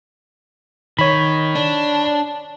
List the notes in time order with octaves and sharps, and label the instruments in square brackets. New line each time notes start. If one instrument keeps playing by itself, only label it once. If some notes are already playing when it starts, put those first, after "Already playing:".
[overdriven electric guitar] D#3 [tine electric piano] C#5 B5
[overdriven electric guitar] D4